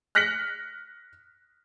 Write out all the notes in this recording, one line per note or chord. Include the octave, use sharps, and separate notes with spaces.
F6 F#6 A#6 B6 C#7 F#7